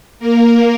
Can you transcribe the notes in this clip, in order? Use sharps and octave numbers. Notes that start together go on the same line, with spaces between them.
A#3 A#4